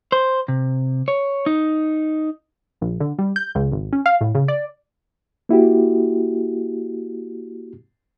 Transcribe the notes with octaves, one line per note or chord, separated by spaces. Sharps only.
C5
C3
C#5
D#4
A#1
D3
G3
G6
C#2
G#1
C#4
F5
A2
C#3
D5
A#3 E4 F#4 G4